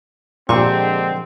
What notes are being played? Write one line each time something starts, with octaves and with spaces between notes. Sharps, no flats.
A#1 A#2 D3 G#3 C4 G4 C#6